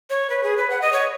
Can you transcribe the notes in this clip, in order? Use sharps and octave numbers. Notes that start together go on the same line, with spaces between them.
C#5
B4
G#4
B4
F#5
D#5
C#5